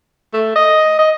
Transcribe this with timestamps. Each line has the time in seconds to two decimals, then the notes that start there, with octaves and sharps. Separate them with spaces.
0.33 A3
0.56 D#5
0.99 D#5